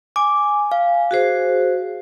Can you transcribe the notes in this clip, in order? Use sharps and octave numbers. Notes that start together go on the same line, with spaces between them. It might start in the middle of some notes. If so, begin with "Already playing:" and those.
G#5 D6
F5
F#4 G#4 C5